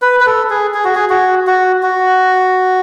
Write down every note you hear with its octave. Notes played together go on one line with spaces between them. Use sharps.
B4
B4
A4
G#4
G#4
F#4
G#4
F#4
F#4
F#4